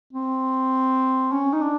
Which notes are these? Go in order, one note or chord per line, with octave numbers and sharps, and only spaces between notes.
C4
C#4
D#4
D4